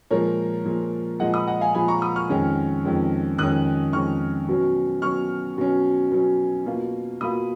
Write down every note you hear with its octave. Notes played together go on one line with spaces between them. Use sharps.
A#2 F3 G#3 A#4 C#5
A#2 F3 G#3
A#2 F3 G#3 D#5 F#5
B5 D#6
D#5 F#5
F5 G#5
A#2 F3 G#3 G#5 B5
A#5 C#6
B5 D#6
C#6 F6
F2 D#3 G#3 C#4
F2 D#3 G#3 C#4
F2 D#3 G#3 C#4 D#6 F#6
F2 D#3 G#3 C#4 C#6 F6
B2 F#3 C#4
B2 F#3 C#4 C#6 F6
B2 F#3 C#4
B2 F#3 C#4
B2 A#3 F4
B2 A#3 F4 B5 D#6